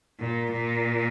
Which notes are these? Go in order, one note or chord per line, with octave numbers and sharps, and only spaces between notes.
A#2
A#2